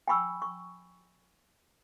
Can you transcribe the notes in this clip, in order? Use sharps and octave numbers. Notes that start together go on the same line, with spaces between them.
G5 G#5 B5 C#6 E6
C#6